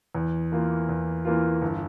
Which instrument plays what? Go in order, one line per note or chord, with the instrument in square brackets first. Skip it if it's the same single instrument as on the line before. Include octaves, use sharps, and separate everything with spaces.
[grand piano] E2
E3 A#3 F4
E2
E3 A#3 F4
G1